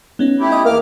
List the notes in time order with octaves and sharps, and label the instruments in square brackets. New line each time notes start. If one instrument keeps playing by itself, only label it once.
[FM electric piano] B3 C#4 D#4
[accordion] A3 E4 G4
[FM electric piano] D#5 G5 D#6
[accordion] E2 D6 F6 [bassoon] A#3